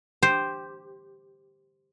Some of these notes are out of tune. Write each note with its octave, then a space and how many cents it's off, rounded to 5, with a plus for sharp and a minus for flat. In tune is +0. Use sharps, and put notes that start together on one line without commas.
G4 +0 C5 +0